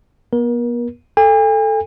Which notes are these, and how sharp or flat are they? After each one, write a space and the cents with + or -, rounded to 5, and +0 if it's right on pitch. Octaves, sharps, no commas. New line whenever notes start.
B3 -40 A#4 +35
A4 +0 G#5 -45